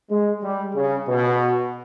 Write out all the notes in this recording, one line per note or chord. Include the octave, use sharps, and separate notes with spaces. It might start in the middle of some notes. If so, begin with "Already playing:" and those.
G#3
G3
C#3
B2